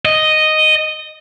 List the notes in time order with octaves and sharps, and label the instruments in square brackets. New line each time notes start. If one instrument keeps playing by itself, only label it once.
[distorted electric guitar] D#5